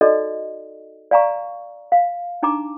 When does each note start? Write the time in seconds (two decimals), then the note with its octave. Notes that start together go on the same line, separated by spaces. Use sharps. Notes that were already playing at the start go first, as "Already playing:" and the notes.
0.01 D#4 F#4 A4 D5 D#5
1.11 D5 F5 G#5 A#5 C#6
1.92 F5
2.43 D4 D#4 G#5 A#5 D6